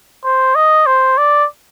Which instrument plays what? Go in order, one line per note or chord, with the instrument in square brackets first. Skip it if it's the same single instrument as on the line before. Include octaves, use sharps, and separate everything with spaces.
[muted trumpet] C5
D#5
C5
D5